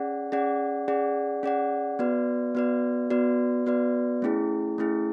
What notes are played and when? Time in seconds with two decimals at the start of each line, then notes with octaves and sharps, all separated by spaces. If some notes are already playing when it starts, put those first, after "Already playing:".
Already playing: C#4 G#4 D5 F#5
0.32 C#4 G#4 D5 F#5
0.88 C#4 G#4 D5 F#5
1.43 C#4 G#4 D5 F#5
1.99 B3 F#4 B4 D5
2.55 B3 F#4 B4 D5
3.10 B3 F#4 B4 D5
3.66 B3 F#4 B4 D5
4.22 A3 C#4 E4 G#4
4.78 A3 C#4 E4 G#4